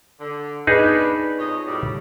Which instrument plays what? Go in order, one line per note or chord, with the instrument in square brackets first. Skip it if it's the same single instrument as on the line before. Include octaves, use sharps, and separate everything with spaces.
[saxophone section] D3
[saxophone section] B3 D4 B4 [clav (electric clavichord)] D#4 G#4
[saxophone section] F2 C#5 D#5
A2 F#3 G3